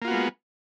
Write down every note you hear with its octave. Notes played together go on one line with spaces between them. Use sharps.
G#3 A#3 B3 F4 F#4